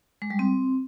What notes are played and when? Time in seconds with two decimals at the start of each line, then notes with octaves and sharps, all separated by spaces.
0.22 G#3
0.30 G3
0.39 C4